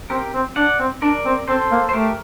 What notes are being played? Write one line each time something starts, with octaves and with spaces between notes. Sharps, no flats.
C4 G4 A#4
C4
D4 D5 F#5
C4
D4 A#4 D5
C4
C4 A4 C5
A#3
C5
A3 G4 A#4